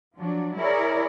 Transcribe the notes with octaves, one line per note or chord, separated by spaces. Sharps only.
F3 F#3 D4
E4 G#4 A#4 C#5 D5